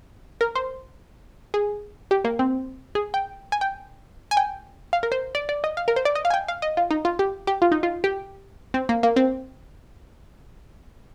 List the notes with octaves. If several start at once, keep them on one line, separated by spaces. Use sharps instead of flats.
A#4
C5
G#4
G4
A#3
C4
G#4
G5
G#5
G5
G#5
G5
F5
A#4
C5
D5
D5
D#5
F5
A#4
C5
D5
D#5
F5
G#5
G5
F5
D#5
F4
D#4
F4
G4
G4
F4
D#4
F4
G4
C4
A#3
A#3
C4